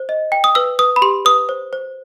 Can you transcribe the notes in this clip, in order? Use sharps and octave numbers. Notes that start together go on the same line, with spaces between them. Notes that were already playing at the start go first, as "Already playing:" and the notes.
Already playing: C5
D#5
G5
D#6
B4 E6
B4 D#6
B5
G4 C6
B4 D#6
C5
C5